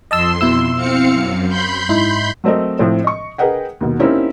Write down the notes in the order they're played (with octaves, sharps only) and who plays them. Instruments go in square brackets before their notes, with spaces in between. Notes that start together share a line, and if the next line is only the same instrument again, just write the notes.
[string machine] F2 C6 [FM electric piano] D#5 A5 E6
[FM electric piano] B2 E4 E6
[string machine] C4 F5 C#7
F#2
B5 C6 G6
[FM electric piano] G#2 D#4 E4
[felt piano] F#3 A3 C4 A#4 D#5
A2 F3 C4
D#5 C#6
G#4 A#4 B4 D#5 F#5 G5
D#2 B2
A#3 C4 C#4 D#4 E4 G4